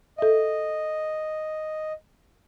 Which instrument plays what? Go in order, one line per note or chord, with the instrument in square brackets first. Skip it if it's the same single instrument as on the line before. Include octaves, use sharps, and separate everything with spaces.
[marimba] A4 E5 [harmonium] D#5